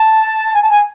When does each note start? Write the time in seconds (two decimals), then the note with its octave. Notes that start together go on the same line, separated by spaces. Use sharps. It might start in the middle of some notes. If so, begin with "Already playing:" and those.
Already playing: A5
0.53 G#5
0.61 A5
0.70 G#5